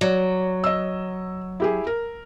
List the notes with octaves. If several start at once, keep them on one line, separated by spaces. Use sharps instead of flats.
F#3 D5
D#5 E6
E4 G4 G#4
A#4